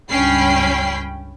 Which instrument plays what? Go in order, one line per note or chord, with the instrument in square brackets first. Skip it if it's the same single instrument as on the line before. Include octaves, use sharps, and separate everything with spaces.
[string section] C#2 G2 C#4 G5 B5 C7